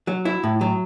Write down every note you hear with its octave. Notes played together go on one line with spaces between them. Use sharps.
F#3
E4
A2
F#3